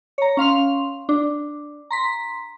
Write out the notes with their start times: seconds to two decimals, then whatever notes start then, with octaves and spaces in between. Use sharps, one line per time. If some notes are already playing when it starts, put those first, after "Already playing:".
0.18 C#5 A#5
0.37 C#4 F5 C6 F7
1.09 D4
1.91 A#5 C6 B6